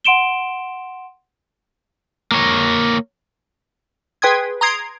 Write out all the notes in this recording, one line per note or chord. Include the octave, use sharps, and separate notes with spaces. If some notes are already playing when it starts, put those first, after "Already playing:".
F#5 C6 D7 E7 G7
A#3 C#5
G#4 B4 G5 C6 D#6 G#6
A#5 C6 D#6 G#6 C7 D7